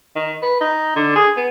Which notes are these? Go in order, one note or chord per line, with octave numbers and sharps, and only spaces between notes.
D#3
B4
D#4
D3
G#4
B3